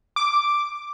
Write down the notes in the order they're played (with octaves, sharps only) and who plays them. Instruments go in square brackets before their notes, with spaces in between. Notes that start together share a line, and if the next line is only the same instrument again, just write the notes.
[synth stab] D6